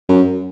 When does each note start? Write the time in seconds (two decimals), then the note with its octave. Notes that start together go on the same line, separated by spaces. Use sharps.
0.09 F#2